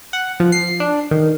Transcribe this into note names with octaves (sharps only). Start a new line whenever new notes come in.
F#5
F3
C7
D4
D#3